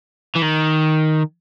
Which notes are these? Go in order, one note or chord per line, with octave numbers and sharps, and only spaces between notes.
E3
D#3